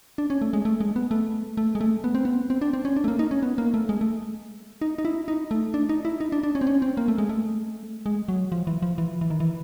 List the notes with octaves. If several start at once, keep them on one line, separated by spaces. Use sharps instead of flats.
D4
C#4
A3
G#3
A3
G#3
B3
A3
A3
G#3
A3
B3
C4
B3
C4
D4
C4
C#4
D4
A3
A#3
D#4
C#4
B3
A#3
A3
G#3
A3
D#4
D#4
E4
D#4
A3
D4
D#4
E4
D#4
D4
D4
C#4
C4
C#4
C4
A#3
A3
G#3
A3
G#3
F#3
F3
E3
F3
E3
E3
D#3
E3